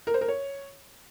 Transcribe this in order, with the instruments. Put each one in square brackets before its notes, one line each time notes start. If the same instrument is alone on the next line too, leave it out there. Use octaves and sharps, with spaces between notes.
[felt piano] A#4
C5
A#4
C#5